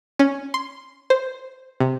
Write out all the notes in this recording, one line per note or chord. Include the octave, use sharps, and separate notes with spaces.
C#4
C6
C5
C3